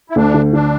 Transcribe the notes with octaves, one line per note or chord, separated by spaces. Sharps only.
E4
D2 D4
D3
D3 D4